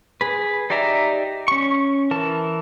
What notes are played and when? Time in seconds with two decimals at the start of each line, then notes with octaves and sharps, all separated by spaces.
0.21 G#4 B4
0.70 D#4 G4 D5 E5 A#5
1.48 C#4 C#6
2.11 E3 A#4 A5